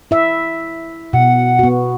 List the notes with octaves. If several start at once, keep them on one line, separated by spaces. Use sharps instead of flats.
E4 E5
B2 F#5
B3 F#4